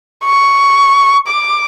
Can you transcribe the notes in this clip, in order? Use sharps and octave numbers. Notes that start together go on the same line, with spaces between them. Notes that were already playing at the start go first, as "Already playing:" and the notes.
C#6
D6